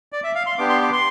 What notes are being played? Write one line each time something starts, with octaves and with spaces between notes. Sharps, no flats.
D5
E5
F5
C6
B3 D4 G4 D6
C6
D6
C6